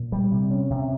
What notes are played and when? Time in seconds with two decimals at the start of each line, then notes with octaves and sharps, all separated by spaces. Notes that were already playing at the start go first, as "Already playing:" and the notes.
Already playing: A#2
0.12 G3
0.32 C3
0.51 C#4
0.70 C3